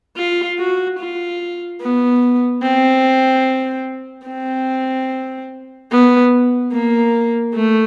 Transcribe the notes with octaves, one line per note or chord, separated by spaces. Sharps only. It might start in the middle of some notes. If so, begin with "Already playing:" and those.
F4
F#4
F4
B3
C4
C4
B3
A#3
A3